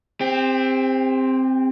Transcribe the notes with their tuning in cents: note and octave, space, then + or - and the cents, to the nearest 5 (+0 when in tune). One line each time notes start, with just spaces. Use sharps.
C4 +0 G4 +40